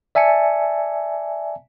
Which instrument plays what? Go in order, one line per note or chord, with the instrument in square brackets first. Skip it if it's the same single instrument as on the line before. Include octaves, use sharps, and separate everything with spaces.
[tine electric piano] D5 E5 G#5 A5 C#7